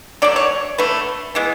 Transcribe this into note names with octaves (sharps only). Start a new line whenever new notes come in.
D3 F#3 A3 D5
C#5
D3 A3 B4
E3 G#3 B3